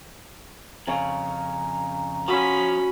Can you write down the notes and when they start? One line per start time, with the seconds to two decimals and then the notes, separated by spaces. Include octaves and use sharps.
0.87 F2 C#3 C#4 F5 A#5
2.28 F3 C#4 F#4 B5